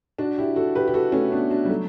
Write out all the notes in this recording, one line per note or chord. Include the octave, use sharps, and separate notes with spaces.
D4 F#4
E4 G4
F#4 A4
G4 B4
G4
F#4 A4
A3 C#4
B3 D4
D4 F#4
G3
F#3 A3